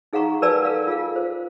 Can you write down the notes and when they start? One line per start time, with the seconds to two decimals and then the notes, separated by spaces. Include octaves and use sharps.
0.13 D#4 G#4 F5 F#5 A#5 C#6
0.42 A#4 B4 D5 G#5 A5 E6
0.65 A4 A#4 F5
0.87 F4 G#4 F5
1.16 C5